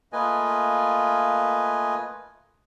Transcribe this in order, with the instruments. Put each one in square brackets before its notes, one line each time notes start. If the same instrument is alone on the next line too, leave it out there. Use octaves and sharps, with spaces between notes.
[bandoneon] A3 A#3 F4 B4 D#5 G#5